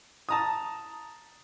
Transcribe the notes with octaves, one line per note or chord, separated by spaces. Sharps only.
A5 A#5 D#6